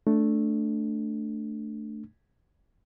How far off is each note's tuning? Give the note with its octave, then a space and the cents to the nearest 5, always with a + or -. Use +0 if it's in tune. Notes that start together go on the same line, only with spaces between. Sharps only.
A3 +0 D4 +0